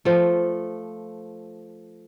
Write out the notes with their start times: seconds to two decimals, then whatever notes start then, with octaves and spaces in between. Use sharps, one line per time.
0.05 F3 A3